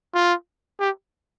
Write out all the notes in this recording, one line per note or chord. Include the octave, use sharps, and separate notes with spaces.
F4
G4